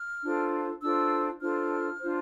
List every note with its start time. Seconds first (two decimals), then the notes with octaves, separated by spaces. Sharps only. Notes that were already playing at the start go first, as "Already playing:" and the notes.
Already playing: F6
0.23 D4 F4 A4 C5
0.81 D4 F4 A4 C5 E6
1.41 D4 F4 A4 C5 F6
1.99 D4 F4 C5